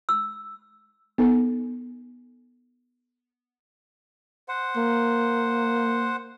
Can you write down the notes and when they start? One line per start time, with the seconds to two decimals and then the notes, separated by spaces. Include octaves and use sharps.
0.09 E6
1.18 B3 D#4 A4
4.48 C5 F#5
4.76 A#3